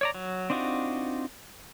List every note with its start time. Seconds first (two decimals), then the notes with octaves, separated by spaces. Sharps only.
0.01 C#5 D5 A#5
0.15 F#3
0.50 C4 D4 D#4 F4 F#4